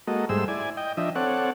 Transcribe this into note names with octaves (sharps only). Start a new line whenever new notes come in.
G#3 A#3 F#4 A4 D#5
G#2 G3 A3 G#4 C5 E6
E4 D5 G#5
D#5 G5
F3 D4 D#5 E5
C4 A4 C#5 D5 F#5